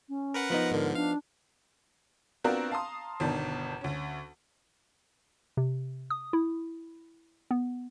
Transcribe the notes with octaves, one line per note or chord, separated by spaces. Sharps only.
C#4
A#4 B4 F#5
F3 B3 D#4
G#2 D3 A#4
D4 F5
B3 C4 D4 F4 F#4 A#4
F5 A5 A#5 C6 D#6
G1 B2 D#3 D4 A5
D2 C#4
C3
D#6
E4
B3